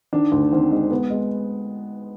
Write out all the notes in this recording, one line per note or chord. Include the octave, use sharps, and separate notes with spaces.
D#3 D4
D2
D#3 C4
G#3
G#3 B3
G#3